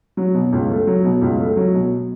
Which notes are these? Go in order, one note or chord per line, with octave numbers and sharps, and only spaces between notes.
F#3
B2
C#2
A3
F#3
B2
C#2
A3
F#3
B2